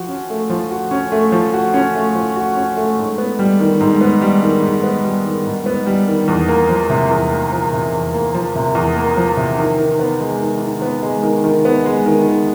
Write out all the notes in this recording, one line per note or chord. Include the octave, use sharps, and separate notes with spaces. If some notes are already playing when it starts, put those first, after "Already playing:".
Already playing: F3 F#4
C#4
A3
F3
F#4
C#4
A3
F3
F#4
C#4
A3
F3
F#4
C#4
A3
G#2
B3
G3
D#3
G#2
B3
G3
D#3
G#2
B3
G3
D#3
G#2
B3
G3
D#3
E2
A#3
F3
C3
E2
A#3
F3
C3
E2
A#3
F3
C3
E2
A#3
F3
C3
D#3
D#3
B3
G#3
D#3
D#3
B3
G#3
D#3
D#3
B3
G#3
D#3
D#3